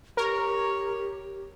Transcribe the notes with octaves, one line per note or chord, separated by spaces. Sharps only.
G4 A#4 C#5